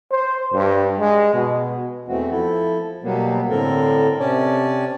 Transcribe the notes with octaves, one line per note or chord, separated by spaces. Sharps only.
C5
G2
G#3
B2
E2 E3 A3 C4 F#4
F3 E4 A4
B2 F#3 G3 A#3 B3
A2 D3 C4 A4 A#4
C3 C#4 C#5 D5 A5